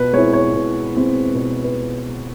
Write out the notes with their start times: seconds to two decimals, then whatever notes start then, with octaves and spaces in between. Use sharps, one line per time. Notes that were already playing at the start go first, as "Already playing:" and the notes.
Already playing: B2 B4
0.13 G#3 C4 E4 C#5
0.33 C#5
0.54 B2
0.94 G#3 C4 E4
1.35 B2 B4
1.64 B4